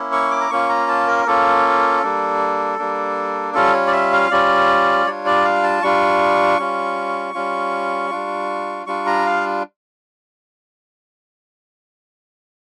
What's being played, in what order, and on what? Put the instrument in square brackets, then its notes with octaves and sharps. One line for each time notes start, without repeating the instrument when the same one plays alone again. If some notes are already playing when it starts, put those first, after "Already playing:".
Already playing: [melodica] A#3 C#4 E4
C#6
D6
A#5
A#3 C#4 F4 C#6
A#5
A5
A#4
A#3 C#4 F4 A4
G3 A#3 D4
G3 A#3 D4
G3 C#4 F4 A4
C#5
D5
E5
F5
G3 C#4 F4 D5
G3 D4 F4 C#5
D5
F5
A5
G3 D4 F4 C#6
G3 C#4 F4
G3 C#4 F4
G3 D4 F4
G3 D4 F4 C#6
A#5
F5